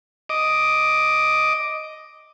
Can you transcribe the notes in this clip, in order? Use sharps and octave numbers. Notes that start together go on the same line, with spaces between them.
D#5 D6